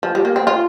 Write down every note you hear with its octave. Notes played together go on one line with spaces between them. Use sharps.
F3
G3
A#3
C4
F4